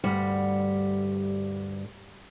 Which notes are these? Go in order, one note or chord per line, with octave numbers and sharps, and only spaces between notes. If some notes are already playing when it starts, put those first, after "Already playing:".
D2 G2 G3 F#5